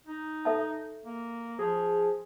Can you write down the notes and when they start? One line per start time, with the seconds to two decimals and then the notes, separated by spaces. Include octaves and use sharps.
0.06 D#4
0.45 A4 E5 A5
1.05 A#3
1.59 F3 G#4